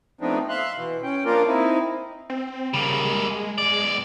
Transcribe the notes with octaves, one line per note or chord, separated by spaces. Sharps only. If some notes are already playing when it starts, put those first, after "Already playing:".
F3 A3 B3 C4 D4 D#4
E5 F5 C6 F#6
B2 E3
C#4 G5
F3 A#3 D4 F4 A#4 D5
C4 D#4 E4
C4
C#3 G3 A#3
G#3
B1 D5